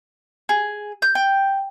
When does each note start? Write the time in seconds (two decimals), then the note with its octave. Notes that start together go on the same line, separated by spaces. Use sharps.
0.49 G#4
1.02 G6
1.15 G5